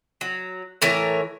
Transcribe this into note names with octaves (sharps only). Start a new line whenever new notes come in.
F#3
A2 E3 A#4 C#5